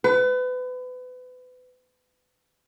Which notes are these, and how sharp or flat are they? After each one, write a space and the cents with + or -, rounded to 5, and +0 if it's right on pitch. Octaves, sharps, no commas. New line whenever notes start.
B4 +30